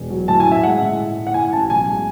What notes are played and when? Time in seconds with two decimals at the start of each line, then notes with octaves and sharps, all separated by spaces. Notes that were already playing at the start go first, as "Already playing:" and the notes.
Already playing: E1
0.10 F#3
0.28 A2 A5
0.40 G#5
0.46 C#4
0.52 E5
0.63 G#3 F#5
0.82 A2
1.00 A2
1.17 A2
1.27 F#5
1.34 A2 G#5
1.52 A1 A5
1.70 B1 G#5
1.88 G#3